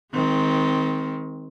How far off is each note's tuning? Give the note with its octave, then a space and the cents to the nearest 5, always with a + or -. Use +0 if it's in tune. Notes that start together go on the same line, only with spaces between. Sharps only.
D#3 +25 G#3 +0 C4 -5